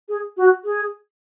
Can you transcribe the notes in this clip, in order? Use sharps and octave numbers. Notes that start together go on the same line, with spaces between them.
G#4
F#4
G#4